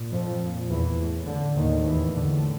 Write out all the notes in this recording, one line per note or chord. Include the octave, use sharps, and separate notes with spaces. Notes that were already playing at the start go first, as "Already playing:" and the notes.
Already playing: A#2
F2 F3
A#2
E2 E3
A2
D3
D#2 A2 D#3
E2 E3
A2 D3